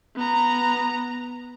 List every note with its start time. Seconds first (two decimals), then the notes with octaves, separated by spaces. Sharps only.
0.16 B3 A#5